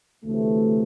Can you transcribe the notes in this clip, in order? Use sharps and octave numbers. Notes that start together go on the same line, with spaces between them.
D2 C3 E3 A3